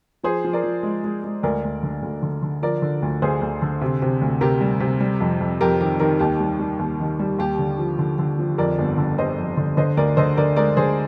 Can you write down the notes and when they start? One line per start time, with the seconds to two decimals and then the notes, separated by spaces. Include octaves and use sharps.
0.23 F3 G#4 C5
0.44 F3
0.53 A#4 D5
0.64 F3
0.83 G#3
1.04 G#3
1.24 G#3
1.43 D2 A#4 D5
1.64 D2
1.83 D3
2.03 D2
2.23 D3
2.42 D3
2.62 F3 A#4 D5
2.82 D3
3.02 D2
3.22 D2 G#4 C5
3.41 D2
3.62 D3
3.81 C3
4.02 C3
4.21 D2
4.41 C3 G4 A#4
4.61 G3
4.80 C3
5.00 G3
5.20 F2
5.41 F2
5.61 F2 G4 A#4
5.81 D#3 G4
6.00 D#3 G4 A#4
6.19 D#2 G4
6.40 G3
6.59 G3
6.79 D#2
7.00 D#3
7.19 G3
7.39 D#2 G4
7.59 D3
7.79 F3
7.99 D3
8.19 D3
8.39 F3
8.58 F2 A#4 D5
8.79 G1
8.98 D3
9.18 G1 C5 D#5
9.38 F2
9.57 D3
9.77 D3 C5 D#5
9.97 D2 A#4 D5
10.17 D3 C5 D#5
10.37 D3 A#4 D5
10.56 G#3 A#4 D5
10.77 D3 G#4 C5